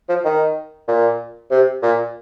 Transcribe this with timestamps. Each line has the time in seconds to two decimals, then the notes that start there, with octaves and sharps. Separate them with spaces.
0.09 F3
0.25 D#3
0.88 A#2
1.51 C3
1.82 A#2